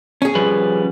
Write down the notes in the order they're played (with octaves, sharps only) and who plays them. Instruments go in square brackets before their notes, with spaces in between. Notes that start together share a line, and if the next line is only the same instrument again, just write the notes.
[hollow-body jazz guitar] C#4 G#4
[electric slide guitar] F3 G3 B4